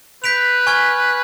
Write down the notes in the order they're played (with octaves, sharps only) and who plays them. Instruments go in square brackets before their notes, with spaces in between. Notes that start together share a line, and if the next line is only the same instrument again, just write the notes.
[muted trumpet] B4 [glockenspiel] G6 B6 D7 F7
[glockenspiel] G#5 C#6 F6 G#6